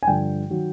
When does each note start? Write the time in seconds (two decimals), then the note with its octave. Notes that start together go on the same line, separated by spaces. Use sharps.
0.03 G#5
0.07 G2 D3 F3 G5
0.50 D#3 F#3